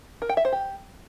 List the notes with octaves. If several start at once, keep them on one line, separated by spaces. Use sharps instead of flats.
A#4
G5
E5
C5
G4